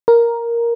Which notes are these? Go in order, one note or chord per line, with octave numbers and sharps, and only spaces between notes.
A#4